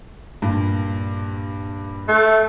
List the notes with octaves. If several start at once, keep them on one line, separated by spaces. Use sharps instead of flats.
G2 A#2
A3